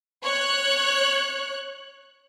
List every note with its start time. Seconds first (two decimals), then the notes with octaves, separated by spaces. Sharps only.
0.24 C#5 F#6